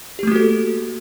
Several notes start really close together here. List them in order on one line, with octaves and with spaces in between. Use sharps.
G4 A3 A#3 F#4 A4